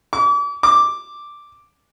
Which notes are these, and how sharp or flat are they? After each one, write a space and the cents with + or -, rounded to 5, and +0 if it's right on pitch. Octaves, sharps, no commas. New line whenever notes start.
D6 -40
D6 +0